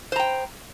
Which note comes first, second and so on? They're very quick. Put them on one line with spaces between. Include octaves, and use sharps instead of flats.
C5 A#5 G5